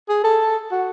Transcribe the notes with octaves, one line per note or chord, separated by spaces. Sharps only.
G#4
A4
F#4